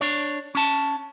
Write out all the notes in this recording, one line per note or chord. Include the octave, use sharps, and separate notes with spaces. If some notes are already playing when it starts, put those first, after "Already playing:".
D4 C#5
C#4 A5